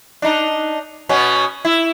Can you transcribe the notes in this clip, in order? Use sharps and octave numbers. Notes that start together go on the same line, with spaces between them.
D4 D#4
B2 B3 C#4
E4